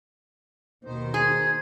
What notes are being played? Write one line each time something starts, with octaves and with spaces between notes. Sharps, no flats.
D#2 B2 D#3 D#4 C5
G#4 G#6